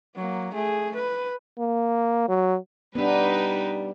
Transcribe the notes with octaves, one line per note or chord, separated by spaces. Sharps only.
F#3 A#3
A3 G#4
B4
A#3
F#3
G3 B3 D4 D#4 B4